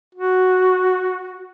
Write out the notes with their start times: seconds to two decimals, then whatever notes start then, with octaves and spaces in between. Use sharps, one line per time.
0.15 F#4